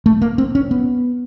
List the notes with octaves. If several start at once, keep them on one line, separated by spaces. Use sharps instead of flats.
A3
A#3
C4
C#4
B3